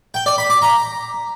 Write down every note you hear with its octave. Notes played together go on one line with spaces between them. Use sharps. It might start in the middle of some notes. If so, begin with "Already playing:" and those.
G5
D5
B5
D6
A#5